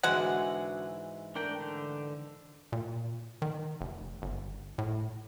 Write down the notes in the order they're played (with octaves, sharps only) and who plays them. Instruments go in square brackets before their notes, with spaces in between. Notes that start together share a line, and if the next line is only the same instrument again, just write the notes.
[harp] G#2 E3 [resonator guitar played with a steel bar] D3 F#4 G#4 [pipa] G#3 F#5
[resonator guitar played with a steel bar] A3 A#4 [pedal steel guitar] D4 G5
[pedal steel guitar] D3
[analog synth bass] A#2
D#3
F1
G1
A2